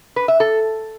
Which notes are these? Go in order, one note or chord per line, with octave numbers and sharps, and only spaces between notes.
B4
E5
A4